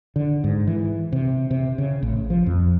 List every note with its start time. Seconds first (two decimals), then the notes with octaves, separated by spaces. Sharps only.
0.16 D3
0.44 G#2
0.67 E3
1.12 C3
1.51 C3
1.78 C#3
2.03 A1
2.30 F3
2.46 F2